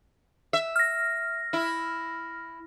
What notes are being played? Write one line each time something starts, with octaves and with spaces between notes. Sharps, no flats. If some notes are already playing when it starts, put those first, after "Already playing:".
E5
F6 A#6
E4